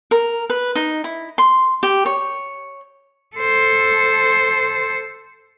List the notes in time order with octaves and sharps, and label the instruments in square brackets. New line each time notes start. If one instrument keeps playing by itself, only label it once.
[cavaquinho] A#4
B4
D#4
E4
C6
G4
C#5
[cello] A4 C5